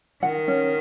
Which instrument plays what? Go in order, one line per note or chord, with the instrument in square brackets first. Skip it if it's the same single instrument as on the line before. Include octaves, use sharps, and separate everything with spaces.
[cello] D#3 [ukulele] F#5
[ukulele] C#4